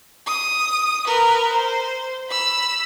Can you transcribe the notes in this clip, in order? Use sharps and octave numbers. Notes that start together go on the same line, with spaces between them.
D#6
A#4 B4
C5
B5 E6